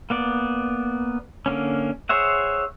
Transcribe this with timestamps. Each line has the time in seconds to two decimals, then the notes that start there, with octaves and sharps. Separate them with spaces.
0.10 A#3 B3 D5
1.46 D3 A#3 C#4
2.09 G#4 C5 C#5 E5 F#5